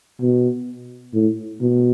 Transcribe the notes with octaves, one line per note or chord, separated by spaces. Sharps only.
B2
A2
B2